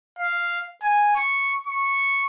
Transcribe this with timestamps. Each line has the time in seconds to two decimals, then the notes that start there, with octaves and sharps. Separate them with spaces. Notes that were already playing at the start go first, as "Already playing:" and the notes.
0.19 F5
0.83 G#5
1.16 C#6
1.67 C#6